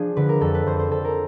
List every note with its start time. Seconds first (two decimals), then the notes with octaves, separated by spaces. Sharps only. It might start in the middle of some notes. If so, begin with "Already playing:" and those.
Already playing: F3 D4 G#4
0.16 D3 B4
0.29 A#4
0.41 F2 A4
0.54 B4
0.66 F2 C5
0.79 C5
0.91 D3 A4
1.04 A#4